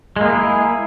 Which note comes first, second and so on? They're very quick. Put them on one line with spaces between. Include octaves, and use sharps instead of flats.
G#3 A#3 G#4 E4